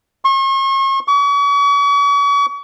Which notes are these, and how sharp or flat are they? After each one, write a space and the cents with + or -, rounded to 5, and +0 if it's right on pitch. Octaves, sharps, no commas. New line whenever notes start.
C#6 -45
C#6 +40